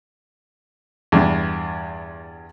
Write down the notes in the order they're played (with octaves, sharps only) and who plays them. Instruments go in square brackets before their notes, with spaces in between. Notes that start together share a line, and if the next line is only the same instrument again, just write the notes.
[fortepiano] E2 G2